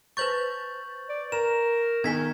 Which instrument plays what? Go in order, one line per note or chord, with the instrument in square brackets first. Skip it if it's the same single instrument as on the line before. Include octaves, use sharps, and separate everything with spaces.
[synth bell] B4 C5 A6 [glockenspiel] C#6 G6 F#7
[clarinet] D5
[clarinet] A#4 [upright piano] A#5 [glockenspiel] E7
[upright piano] D#3 [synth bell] B3 G#5 [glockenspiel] G#6 B6